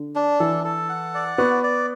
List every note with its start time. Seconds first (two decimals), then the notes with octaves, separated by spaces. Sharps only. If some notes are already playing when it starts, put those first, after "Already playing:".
Already playing: D3
0.16 D4
0.40 E3 A4
0.64 A4
0.89 F#5
1.14 D5
1.38 B3 F#4
1.63 D5